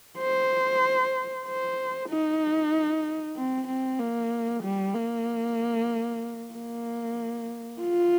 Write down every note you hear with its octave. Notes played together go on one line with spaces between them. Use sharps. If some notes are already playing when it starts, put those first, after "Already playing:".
C5
C5
D#4
C4
C4
A#3
G3
A#3
A#3
F4